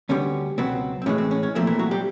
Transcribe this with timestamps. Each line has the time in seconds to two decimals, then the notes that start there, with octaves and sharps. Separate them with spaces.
0.09 D2 D3 G3 B3 C#4
0.58 C#2 B2 F#3 B3 C4
1.02 C4
1.06 A2 E3 G#3 C#4
1.18 C4
1.31 C#4
1.43 C#4
1.55 A#2 F3 A3 C4
1.67 E3 E4
1.79 F#3 F#4
1.91 G3 G4